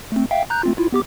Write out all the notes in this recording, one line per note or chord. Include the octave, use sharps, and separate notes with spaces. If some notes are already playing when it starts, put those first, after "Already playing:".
A3 C4
E5 F5 G5
A#5 F#6 G6
A3 C4 F4
E4 F4
B3 G4 D6